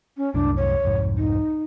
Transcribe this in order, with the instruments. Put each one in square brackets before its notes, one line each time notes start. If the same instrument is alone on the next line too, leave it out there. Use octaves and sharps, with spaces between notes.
[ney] C#4
[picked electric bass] C2 F#2 A2 [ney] D4
[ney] C#5
[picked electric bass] C2 F2 G#2
[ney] D#4